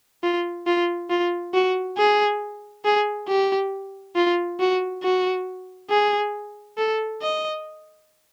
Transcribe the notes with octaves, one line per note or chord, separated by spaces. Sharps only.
F4
F4
F4
F#4
G#4
G#4
G4
F4
F#4
F#4
G#4
A4
D#5